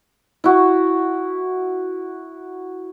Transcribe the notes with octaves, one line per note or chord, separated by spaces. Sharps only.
E4 F#4